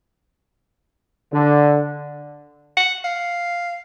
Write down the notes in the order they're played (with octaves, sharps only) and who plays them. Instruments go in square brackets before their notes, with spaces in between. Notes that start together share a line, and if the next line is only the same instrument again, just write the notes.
[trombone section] D3
[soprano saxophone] F#5
F5